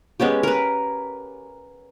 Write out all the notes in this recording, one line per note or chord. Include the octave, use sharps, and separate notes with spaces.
G#3 B3 C#4 G4
A#4 B4